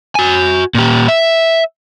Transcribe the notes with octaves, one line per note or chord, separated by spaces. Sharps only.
F#4 G#5
A#2 G4
E5